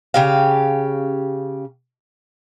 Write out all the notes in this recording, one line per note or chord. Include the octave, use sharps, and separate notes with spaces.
C#3 G4 F5